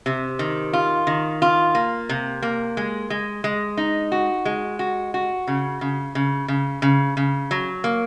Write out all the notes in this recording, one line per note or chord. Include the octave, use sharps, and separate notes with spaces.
C3
D#3
F4
D#3
F4
A#3
C3
A#3
G#3
G#3
G#3
D#4
F#4
G#3
F#4
F#4
C#3
C#3
C#3
C#3
C#3
C#3
F#3
A#3